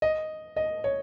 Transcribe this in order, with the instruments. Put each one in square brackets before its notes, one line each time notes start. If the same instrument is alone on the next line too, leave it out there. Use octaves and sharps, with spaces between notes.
[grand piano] D#5
D#5
C#5